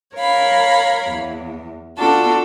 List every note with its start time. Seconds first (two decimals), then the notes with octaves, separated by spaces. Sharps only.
0.16 A#4 C#5 F5 B5
1.10 E2
1.98 B3 D4 F4 F#4 A4